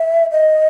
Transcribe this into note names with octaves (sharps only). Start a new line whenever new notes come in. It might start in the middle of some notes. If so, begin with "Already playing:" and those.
Already playing: E5
D#5